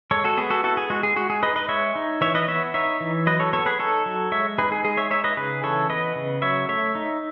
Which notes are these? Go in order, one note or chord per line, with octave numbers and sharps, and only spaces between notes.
G#3 A4 C#5
F#4 A4
B3 G#4
F#4 A4
E4 F#4 A4
G#4
G#3 F#4
G#4
G#3 F#4
G#4
D#4 B4 D#5
B4 D#5
G#3 C#5 E5
D#4
E3 C#5 E5
B4 D#5
B3 C#5 E5
D#4 C#5 E5
E3
F#3 B4 D#5
A4 C#5
B3 A4 C#5
G#4 B4
D#4 A4 C#5
F#3
G#3 C#5 E5
D#4 G#4 B4
G#4
G#3 G#4
C#5 E5
D#4 C#5 E5
B4 D#5
C#3 G#4 B4
E3 A4 C#5
B3 B4 D#5
C#3
F#3 C#5 E5
A3 C#5 E5
D#4